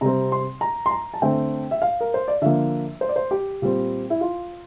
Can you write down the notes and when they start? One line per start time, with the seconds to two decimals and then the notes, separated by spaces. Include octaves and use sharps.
0.01 C3 G3 C4 A#5
0.32 C6
0.61 A#5
0.86 C6
0.91 A#5
1.14 A5
1.22 D3 A3 C4 G5
1.71 E5
1.82 F5
2.01 A#4
2.14 C5
2.28 D5
2.42 D3 F3 A#3 E5
3.01 C5
3.09 D5
3.16 C5
3.31 G4
3.62 A#2 G3 C4
4.10 E4
4.21 F4